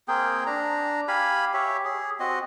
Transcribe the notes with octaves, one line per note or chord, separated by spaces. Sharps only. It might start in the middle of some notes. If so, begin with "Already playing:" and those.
A#3 C4 G#4 G5
D4 A#5
G4 F5 G#5 B5
G4 C#5 E5
G#4
C4 F#4 D#5